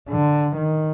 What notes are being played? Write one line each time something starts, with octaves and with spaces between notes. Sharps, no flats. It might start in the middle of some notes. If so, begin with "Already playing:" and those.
D3
D#3